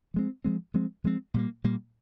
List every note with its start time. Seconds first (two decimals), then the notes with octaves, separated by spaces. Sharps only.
0.14 F3 G#3 C4
0.44 F3 G#3 C4
0.74 F3 G#3 C4
1.04 F3 G#3 C4
1.34 A#2 G3 A#3
1.64 A#2 G3 A#3